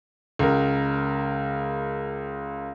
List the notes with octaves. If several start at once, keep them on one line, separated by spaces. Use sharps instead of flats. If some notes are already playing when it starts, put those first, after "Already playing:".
C#2 A#4